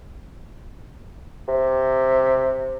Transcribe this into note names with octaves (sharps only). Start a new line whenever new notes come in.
C3